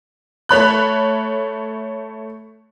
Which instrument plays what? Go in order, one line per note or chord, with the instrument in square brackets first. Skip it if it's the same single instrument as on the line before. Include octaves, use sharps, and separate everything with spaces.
[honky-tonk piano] A3 C#5 B5 F#6